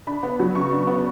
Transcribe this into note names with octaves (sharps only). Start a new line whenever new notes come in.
D4 B5
B3
F#3
C#3 C#6
D4
B3